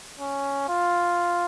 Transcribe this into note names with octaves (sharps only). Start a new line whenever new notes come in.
C#4
F4